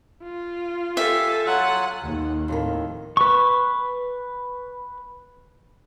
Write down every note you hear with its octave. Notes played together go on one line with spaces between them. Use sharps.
F4
G4 A4 E5 F5 G#5
F#3 F4 F#5 G#5
D#2
F2 A2 D#3
B4 C#6